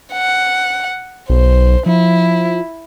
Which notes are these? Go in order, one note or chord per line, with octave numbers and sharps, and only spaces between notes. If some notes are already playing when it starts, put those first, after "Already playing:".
F#5
B1 C5
F3 E4